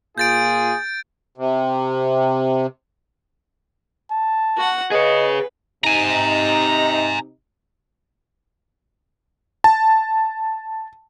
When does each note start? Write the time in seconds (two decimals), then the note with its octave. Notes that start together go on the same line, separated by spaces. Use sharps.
0.18 A#2 F4 G#4 G6 A6 D7
1.38 C3
4.11 A5
4.57 F#4 F#5
4.92 G#4 B4 C#5 D#5
5.84 C3 D#4 G#5 A#5
9.64 A5